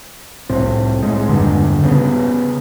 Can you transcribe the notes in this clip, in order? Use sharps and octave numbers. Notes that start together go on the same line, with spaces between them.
C2 A2 C4
A2 G#3
E2 G2 A#2 D3
C#3 B3